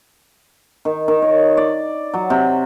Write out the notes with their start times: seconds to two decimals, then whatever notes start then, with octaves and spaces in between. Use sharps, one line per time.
0.85 D#3
1.08 D#3
1.22 C#5
1.57 D5
2.14 F#3
2.30 C3